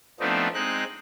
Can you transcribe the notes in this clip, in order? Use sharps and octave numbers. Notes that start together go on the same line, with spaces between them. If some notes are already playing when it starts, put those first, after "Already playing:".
F3 A3 B3 C4 D4 D#4
G#3 C4 D#4 F#6